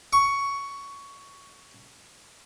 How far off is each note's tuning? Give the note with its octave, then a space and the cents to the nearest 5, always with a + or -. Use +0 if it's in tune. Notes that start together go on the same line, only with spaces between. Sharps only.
C#6 +10